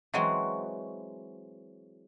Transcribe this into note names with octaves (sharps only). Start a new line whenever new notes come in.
E3 F#3 G#3 C4 F#4